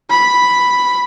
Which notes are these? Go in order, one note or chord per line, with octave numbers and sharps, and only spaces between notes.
B5